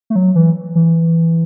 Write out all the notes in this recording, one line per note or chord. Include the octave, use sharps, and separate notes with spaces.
A3
F#3
E3
E3